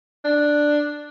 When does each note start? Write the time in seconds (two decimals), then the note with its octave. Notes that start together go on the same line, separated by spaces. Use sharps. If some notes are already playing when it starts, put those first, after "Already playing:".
0.25 D4